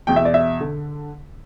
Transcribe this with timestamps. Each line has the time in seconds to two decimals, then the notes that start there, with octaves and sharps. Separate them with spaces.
0.07 E2 B2 G5
0.16 E5
0.25 D5
0.34 E5
0.61 D3